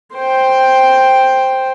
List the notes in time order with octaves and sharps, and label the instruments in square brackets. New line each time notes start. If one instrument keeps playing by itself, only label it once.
[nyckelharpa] C5 G5